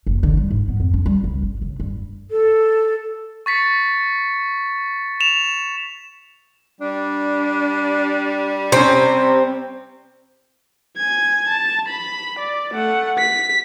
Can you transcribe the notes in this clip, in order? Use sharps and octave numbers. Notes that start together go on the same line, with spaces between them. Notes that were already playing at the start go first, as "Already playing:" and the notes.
F#1
D3
G3
G#2
B3
F2
C#4
G3
C#2
G1
C#3
G2
A4
C#6 A6 B6 C#7
E7 F7
G3 D4
C3 C4 C#4
G#5 G#6
A5
B5
D5
A3 F#5
B6